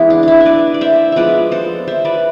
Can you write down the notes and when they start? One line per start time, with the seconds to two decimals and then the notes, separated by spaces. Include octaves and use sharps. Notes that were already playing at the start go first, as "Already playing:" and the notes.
Already playing: E3 G#3 B3 E4
0.10 D4
0.23 D4 E4
0.40 E5
0.46 B4 D5
0.74 D5
0.81 C5 E5
1.12 F3 G#3 B3 B4 D5 E5
1.52 A4 C5
1.88 C5 E5
2.05 B4 D5